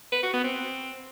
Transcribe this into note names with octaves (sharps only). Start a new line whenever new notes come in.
B4
F#4
B3
C4